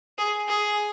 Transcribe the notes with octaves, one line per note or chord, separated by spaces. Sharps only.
G#4
G#4